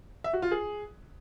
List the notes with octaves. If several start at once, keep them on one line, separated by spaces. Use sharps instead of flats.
E5
F#4
F4
G#4